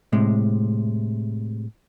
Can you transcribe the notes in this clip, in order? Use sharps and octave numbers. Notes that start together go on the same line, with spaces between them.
A2 C3 G#3